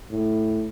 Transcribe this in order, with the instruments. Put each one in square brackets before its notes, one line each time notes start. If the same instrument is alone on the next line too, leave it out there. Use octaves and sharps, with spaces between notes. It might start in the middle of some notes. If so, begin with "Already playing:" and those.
[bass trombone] A2